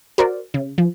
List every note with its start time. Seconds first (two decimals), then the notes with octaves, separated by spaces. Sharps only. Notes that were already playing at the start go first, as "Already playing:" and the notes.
0.18 F#4 A#4 C5 D5
0.54 C#3
0.78 F3